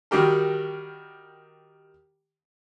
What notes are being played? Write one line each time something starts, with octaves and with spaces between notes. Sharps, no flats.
D#3 G3 F#4 G4 A#4